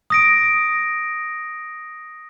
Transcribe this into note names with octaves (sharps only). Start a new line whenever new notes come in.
D#6 A#6 D7